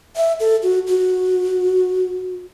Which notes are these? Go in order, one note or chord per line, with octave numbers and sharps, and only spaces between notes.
E5
A4
F#4
F#4